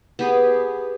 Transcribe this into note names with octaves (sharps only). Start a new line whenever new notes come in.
B3 G4 G#4